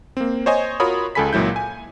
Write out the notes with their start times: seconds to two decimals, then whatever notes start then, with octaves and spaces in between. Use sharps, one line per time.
0.17 A#3 C4
0.46 C5 C#5 D#5 G#5
0.80 F4 F#4 A#4 C#5 B5 D#6
1.15 C#2 G#3 A4 G#5 B5 B6
1.33 C#2 A#2 F#3 E4 G6
1.56 G#5